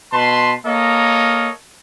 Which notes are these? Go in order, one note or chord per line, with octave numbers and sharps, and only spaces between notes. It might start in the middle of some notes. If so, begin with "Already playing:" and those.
B2 B4 A5 C6
A#3 A4 A#4 C#5 D#5